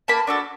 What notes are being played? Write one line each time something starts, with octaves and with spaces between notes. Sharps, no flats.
A#3 A5 B5
D4 F#4 A4